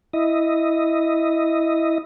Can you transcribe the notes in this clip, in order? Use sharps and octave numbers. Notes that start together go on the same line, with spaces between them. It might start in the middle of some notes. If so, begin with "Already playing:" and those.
E4 D#5